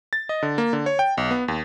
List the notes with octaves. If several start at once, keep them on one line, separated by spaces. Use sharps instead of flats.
A6
D#5
D3
A#3
D3
C#5
G5
B1
B3
D#2